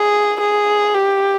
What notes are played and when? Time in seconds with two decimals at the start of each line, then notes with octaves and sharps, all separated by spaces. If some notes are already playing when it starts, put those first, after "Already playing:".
Already playing: G#4
0.41 G#4
0.95 G4